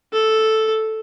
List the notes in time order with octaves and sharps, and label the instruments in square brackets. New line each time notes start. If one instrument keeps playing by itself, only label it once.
[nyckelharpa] A4